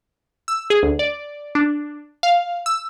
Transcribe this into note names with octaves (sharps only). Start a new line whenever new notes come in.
E6
G#4
D2
D5
D4
F5
E6